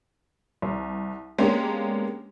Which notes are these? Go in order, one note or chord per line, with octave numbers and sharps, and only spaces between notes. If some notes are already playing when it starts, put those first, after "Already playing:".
C2
G#3 A#3 B3 C#4 D4 G4